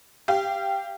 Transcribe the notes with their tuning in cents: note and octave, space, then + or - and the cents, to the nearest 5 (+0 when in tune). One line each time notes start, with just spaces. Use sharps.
G4 +0 F5 -30